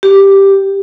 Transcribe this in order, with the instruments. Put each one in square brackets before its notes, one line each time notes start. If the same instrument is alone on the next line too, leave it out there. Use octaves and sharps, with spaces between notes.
[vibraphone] G4